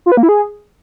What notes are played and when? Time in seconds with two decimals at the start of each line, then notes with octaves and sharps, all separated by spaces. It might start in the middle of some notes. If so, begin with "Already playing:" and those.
0.06 F4
0.12 B4
0.17 A#3
0.23 E4
0.29 G#4